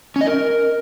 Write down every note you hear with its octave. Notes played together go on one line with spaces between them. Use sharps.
C#4
D#5
A#4